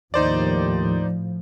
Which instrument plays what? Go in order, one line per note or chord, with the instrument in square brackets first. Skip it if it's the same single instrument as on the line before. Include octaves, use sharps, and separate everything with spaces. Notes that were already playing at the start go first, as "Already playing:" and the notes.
[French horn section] D#2 [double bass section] A2 F3 [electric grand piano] D#4 C5 D5